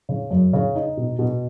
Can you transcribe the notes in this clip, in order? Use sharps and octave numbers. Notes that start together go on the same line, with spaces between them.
C#3
F#2
C#3
D#4
B2
B2